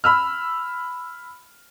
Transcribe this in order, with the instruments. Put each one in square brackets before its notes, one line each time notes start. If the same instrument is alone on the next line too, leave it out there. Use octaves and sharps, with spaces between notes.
[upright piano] B5 E6 F6